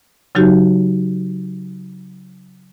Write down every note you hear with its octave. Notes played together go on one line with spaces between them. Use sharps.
C#3 F#3 D#4 F#4 G4